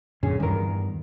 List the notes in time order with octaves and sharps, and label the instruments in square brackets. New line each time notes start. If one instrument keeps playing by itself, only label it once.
[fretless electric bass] F#2 A#2 D3 [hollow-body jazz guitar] C#4 G#4
[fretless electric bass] E2 D#3 [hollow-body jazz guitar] G2 A#4